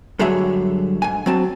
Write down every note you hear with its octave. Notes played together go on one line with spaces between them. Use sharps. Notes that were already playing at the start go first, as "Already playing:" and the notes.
G2 D3 F#3 G#4 C#5 E5
G#2 G#5
F#3 C4 A5